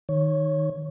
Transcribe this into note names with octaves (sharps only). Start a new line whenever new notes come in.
D#3 C#5